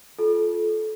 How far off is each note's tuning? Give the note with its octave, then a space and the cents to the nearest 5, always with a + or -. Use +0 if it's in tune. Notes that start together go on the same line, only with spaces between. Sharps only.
F4 +0 A4 -25